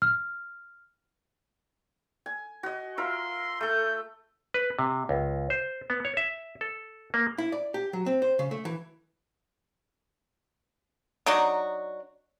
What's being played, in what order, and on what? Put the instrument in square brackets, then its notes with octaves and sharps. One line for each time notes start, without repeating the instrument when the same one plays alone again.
[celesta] F6
[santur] G#5
F#4 D#5
[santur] F4 A#4 E5 [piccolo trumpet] C6
[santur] A3 A4 [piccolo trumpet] G6
[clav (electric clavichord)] B4
C3
C#2
C5
B3
C#5
E5
A4
A#3
[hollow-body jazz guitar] E4
D5
G4
F#3
C4
C5
C#3
A3
E3
[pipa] F#3 D4 D#4 F#4